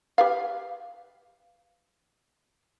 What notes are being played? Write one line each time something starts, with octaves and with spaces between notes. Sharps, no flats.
G4 B4 F5